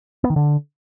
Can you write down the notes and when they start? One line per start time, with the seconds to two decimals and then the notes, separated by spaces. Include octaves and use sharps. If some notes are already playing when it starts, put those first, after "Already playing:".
0.24 B3
0.30 D#3
0.36 D3